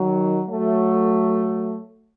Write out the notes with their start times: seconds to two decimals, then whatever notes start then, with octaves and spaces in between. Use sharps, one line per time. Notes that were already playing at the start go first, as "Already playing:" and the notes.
Already playing: D#3 F#3
0.48 F#3 A3